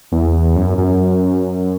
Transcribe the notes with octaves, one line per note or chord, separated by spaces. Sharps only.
E2
F#2
F#2